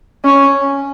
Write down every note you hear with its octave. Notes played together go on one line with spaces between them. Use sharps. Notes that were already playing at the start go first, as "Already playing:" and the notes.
C#4